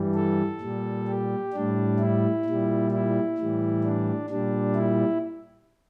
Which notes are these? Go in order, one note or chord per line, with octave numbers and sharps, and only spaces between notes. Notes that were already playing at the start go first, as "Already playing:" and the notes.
Already playing: G2 E3 G3
A4
A#2 G3
G4
A2 G3 D4
E4
A#2 G3
E4
A2 E3 G3
D4
A#2 G3 D4
E4